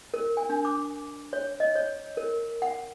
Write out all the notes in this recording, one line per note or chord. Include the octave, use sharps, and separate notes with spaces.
A#4
G#5
D4
D6
C#5
D#5
C#5
A#4
F#5